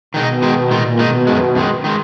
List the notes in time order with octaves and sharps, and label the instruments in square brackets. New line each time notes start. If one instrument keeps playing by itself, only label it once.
[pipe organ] B2 [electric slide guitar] D#3 G#3 D#4
[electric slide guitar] D#3 G#3 D#4
[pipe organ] A#2 [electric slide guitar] D#3 G#3 D#4
[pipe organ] B2 [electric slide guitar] D#3 G#3 D#4
[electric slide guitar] F#2 D#3 G#3
F#2 D#3 G#3
D#3 G#3